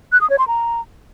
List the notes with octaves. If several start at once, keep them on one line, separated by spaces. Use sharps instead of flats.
F#6
D#6
C#5
C6
A#5